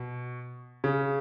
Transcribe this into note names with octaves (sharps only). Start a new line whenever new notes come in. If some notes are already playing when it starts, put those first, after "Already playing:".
Already playing: B2
C#3